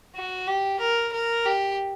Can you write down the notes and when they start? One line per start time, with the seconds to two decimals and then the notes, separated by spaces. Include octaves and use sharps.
0.16 F#4
0.48 G4
0.80 A#4
1.13 A#4
1.46 G4